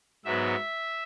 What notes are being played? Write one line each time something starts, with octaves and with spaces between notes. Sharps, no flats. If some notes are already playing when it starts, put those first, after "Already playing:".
G#2 F#3 B3 E5